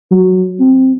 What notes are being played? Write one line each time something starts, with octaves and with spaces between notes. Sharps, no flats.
F#3
C4